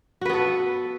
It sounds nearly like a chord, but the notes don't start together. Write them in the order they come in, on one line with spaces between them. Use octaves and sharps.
F#4 B4 B3 A4